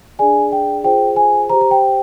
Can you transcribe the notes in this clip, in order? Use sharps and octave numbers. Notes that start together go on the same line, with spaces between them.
D4 G#4 D5 G#5
G5
F4 G#4 C5 G5
G#5
G4 C5 A#5
A#5
G5